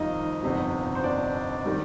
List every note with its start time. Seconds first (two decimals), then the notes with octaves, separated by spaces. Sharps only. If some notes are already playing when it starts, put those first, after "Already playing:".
Already playing: F2 D#3 G3 D#4 F4 D#5
0.42 G1 F2 C3 G3
0.95 C5
1.04 D4 D5
1.65 D#3 G3